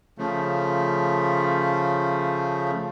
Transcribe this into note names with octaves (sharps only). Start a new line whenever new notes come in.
C#3 F3 A3